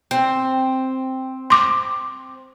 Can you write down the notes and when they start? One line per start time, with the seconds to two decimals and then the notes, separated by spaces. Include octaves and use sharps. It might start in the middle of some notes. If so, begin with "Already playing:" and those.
0.11 C4
1.50 C6 D6